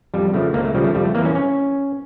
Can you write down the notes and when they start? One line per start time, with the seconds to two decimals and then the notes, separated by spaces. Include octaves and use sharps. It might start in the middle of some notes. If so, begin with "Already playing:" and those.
0.14 F2 G3
0.34 C#3 F3 A3
0.54 C#2 A#3
0.65 A3
0.74 C#3 F3 G3
0.84 A3
0.95 F2 G3
1.05 A3
1.14 E3 A#3
1.25 C#4
1.35 C#4